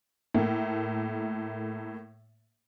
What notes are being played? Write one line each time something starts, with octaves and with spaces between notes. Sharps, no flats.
A2 A3 A#3